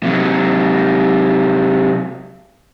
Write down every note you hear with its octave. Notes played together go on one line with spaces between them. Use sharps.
C3 F#3